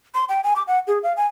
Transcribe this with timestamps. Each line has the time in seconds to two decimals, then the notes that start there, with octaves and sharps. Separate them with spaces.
0.14 C6
0.29 G5
0.44 G#5
0.56 D6
0.67 F#5
0.87 G#4
1.03 F5
1.17 G#5